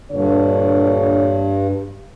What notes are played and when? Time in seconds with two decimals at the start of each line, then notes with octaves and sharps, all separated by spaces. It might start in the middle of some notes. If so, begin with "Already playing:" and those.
0.11 G2 A#2 D3 C#5